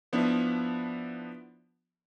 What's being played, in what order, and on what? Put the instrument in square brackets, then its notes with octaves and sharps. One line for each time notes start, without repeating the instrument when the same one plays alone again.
[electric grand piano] F3 B3 D4 E4